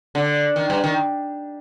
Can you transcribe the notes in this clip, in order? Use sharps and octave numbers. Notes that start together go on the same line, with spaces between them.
D3
D#3
G2
D#3